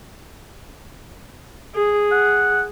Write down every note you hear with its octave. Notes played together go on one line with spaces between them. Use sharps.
G#4
F#5